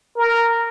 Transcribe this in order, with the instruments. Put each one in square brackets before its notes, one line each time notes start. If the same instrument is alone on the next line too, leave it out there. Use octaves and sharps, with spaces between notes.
[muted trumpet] A#4